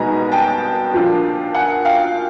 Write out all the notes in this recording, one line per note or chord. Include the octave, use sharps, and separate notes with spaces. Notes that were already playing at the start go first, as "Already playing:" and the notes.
Already playing: C2 B2 G#3 B3 D#4 G#5 A#5
G5 A5
A#2 F3 A#3 D4 F4
F#5 G#5
F5 G5